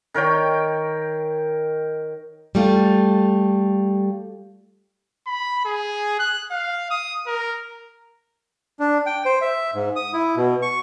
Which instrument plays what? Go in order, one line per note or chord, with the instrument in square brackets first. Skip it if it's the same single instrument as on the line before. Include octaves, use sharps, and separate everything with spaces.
[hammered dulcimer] D#3 A#4 C#5 G5
[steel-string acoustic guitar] G3 A3 F4
[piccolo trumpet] B5
G#4
F#6
F5
D#6
A#4
[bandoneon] D4
G5
C5
E5
G#2
D#6
E4
B2
C#6